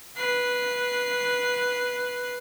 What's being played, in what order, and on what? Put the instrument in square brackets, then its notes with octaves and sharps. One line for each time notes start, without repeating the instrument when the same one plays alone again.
[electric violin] B4 C7